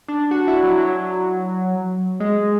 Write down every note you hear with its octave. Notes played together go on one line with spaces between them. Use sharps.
D4
F#4
E4
F#3
F#3
G#3